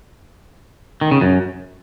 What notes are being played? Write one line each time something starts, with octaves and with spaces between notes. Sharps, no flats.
D#3
C#3
F#2